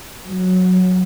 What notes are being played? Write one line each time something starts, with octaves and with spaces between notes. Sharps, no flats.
F#3